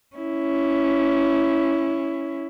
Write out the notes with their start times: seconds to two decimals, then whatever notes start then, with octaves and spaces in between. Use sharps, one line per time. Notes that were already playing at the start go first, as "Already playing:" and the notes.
0.16 C#4 E4